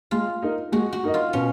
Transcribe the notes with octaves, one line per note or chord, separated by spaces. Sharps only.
G#3 F4
D#4 A#4 D#5
G#3 F#4
F#4
D#4 A#4 D#5
F4
B2 C#4